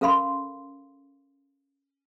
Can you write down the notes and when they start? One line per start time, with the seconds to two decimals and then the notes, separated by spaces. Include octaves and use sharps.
0.01 C#4 A4 A#4 F5 B5 C6